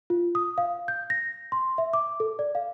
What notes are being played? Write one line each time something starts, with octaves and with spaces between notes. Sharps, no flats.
F4
D#6
F5
G6
A#6
C6
E5
D6
A4
D5
F5